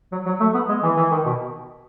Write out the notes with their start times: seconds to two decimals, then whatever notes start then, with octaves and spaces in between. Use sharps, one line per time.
0.12 F#3
0.26 F#3
0.40 A3
0.54 B3
0.69 G#3
0.83 E3
0.97 E3
1.11 D#3
1.25 B2